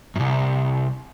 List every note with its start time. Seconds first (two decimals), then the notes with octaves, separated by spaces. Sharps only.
0.16 C2 F#2